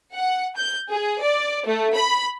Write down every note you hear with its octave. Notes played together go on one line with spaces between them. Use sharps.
F#5
G6
G#4
D5
A3
B5